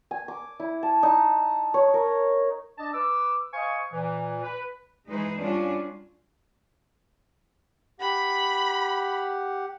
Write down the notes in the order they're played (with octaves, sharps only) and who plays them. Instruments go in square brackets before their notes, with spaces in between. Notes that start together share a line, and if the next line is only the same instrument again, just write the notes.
[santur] G#5
D6
E4
A5
D#4
C#5
A#4
[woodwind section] D4 D#5 A5
B4 D6 E6
C5 D#5 F5 G#5 C#6
A#2 E3
B4
[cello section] E3 G#3 D#4 G#4 B4 C5
G3 C#4 D4 F4 F#4
[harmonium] G4 F#5 [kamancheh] B5